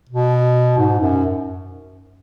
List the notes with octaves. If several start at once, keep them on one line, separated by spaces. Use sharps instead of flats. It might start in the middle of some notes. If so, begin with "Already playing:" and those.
B2
G#2
F#2